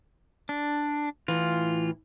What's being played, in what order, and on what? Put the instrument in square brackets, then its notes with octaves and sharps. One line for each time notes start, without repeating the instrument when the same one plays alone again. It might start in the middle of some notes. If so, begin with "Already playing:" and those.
[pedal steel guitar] D4
[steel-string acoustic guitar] A2 E3 [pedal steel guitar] F4